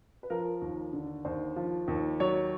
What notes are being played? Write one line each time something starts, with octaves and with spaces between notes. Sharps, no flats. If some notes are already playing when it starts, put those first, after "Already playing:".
B4
F3 A#4
D#2
D3
D#2 C5
F3
D#2
F#3 C#5